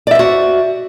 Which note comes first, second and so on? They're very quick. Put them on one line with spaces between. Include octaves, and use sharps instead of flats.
D5 E5 C5 F#4